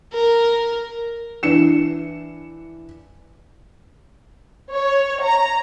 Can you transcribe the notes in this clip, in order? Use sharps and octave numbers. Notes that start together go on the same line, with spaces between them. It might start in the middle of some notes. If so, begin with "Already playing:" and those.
A#4
E3 D4 C#7 E7
C#5
A#5